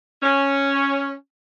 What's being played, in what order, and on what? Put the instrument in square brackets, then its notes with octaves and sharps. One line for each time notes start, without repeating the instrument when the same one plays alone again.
[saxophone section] C#4